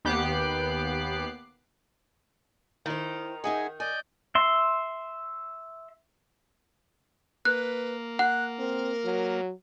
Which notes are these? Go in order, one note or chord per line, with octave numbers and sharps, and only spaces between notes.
D#2 B3 G4 D6 F#6 C7
D#3 E4 C5 A#5
D#4 G#4 D#5 E5 F#5 G#5
D5 D#5 G#5 G6
E5 C6
A#3 B4 F#6
F#5 F#6
C4 A#4
F#3